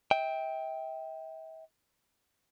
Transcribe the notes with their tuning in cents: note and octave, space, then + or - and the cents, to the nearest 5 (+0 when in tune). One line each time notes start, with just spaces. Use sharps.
E5 -40 G5 +0